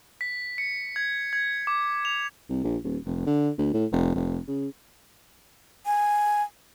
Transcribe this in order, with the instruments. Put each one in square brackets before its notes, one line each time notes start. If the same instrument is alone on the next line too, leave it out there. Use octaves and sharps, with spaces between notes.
[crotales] B6
C#7
G#6
G#6
D6
F7
[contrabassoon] C2
A#1
D#1
F1
D3
D2
A2
F1
F1
C#3
[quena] G#5